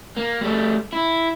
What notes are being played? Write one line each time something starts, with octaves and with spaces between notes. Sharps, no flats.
A#3
G3 A3
E4